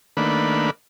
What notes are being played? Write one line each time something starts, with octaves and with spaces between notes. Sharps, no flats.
D#3 A3 A#3 D4 B4 B5